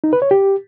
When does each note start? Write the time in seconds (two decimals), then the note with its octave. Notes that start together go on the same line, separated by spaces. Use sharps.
0.04 D#4
0.13 B4
0.22 C#5
0.31 G4